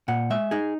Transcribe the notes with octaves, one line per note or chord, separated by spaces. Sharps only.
A#2 F#5
G#3 E5
D#4 G#4